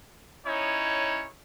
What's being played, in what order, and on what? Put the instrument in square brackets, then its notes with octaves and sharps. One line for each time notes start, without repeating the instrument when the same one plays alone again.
[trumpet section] C#4 D#4 E4 C#5